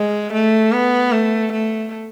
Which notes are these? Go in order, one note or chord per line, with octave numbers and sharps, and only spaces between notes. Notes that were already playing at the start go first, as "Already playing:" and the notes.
Already playing: G#3
A3
B3
A3
A3